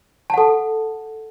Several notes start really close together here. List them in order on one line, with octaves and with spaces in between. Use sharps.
A5 F#5 A4